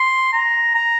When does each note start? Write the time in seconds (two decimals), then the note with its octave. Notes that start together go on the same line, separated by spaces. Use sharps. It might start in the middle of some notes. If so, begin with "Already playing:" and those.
Already playing: C6
0.33 A#5
0.74 A#5